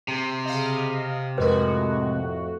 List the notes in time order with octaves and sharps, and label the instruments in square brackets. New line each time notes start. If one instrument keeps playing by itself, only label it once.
[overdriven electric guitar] C3
[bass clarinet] C#3 [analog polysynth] D#5 F5
[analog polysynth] F2 A2 F#4 [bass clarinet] G#3 [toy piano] A#4 B4